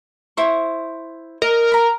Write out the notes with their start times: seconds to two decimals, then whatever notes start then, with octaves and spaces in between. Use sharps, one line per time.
0.37 E4 C5 C#6
1.42 A#4 D#5
1.72 A#5 B5